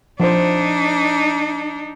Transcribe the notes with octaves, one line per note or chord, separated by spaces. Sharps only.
F3 D4 D#4 C5